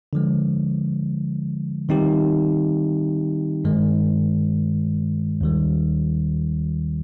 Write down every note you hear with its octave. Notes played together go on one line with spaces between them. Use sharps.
D3 F3 G#3
D#3 G3 C4 D#4 G4
G2 D#3 G#3
D#2 D#3 G3